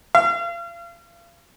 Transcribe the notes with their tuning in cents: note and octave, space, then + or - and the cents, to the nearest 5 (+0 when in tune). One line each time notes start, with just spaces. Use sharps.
F5 -35